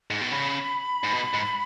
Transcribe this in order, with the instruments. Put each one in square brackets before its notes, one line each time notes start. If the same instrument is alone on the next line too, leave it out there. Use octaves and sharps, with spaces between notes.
[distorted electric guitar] G#2
B2
[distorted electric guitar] C#3 [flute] B5
[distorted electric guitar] G#2
B2
G#2